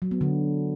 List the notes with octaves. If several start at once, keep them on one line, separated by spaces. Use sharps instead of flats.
F#3
B3
D3